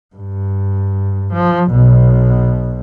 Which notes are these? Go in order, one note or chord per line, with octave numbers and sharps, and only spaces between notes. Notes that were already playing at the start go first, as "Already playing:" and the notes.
G2
F3
B1 B2